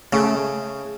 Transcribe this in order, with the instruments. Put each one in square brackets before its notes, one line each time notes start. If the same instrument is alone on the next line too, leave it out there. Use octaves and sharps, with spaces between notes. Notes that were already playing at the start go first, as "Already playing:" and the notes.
[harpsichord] C#3 [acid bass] A3